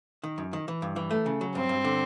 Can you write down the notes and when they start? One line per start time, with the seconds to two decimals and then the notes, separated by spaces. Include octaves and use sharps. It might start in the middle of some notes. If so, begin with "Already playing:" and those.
0.23 D#3
0.38 F#2
0.53 D#3
0.68 E3
0.82 G2
0.96 E3
1.11 A3
1.26 C#3
1.41 F#3
1.55 G2 C4
1.69 G2
1.84 D3